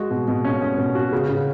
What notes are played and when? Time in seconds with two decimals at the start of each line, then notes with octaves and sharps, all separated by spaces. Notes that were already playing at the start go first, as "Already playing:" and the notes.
Already playing: G#3 F#4
0.11 B2
0.28 B2
0.44 C#4
0.62 C#4
0.78 B2
0.95 F#4
1.13 C#3
1.29 C#3